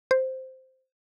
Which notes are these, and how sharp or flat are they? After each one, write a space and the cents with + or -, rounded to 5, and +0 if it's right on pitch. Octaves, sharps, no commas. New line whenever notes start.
C5 -5